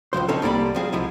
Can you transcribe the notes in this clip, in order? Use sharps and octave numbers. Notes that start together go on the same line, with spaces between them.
C#2 C3 F3 C5
C4 C#4 D#4 A4 C#5
C2 G3 A#3 D5 B5
F3 C4 G#4
C2 F3 G#3 E4